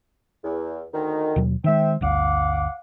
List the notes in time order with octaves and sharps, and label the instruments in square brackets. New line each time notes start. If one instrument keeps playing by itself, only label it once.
[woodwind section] E2
D2 D#3
[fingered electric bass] D#2 B2 F#3
[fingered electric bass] D#3 G#3 [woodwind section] C4 E5
[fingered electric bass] G1 D2 [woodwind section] F5 F#5 D6